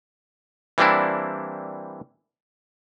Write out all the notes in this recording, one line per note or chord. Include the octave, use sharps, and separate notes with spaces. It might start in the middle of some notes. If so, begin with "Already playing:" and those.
E3 G3 A#3 C4 D4 E4